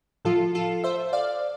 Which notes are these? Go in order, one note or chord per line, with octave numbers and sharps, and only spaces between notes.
A2 F3 F4 A4
F4 A4
C5 E5
D5 F5